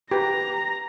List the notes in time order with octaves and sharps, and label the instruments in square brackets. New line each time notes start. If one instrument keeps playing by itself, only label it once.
[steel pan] G4 B4 [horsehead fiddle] A#5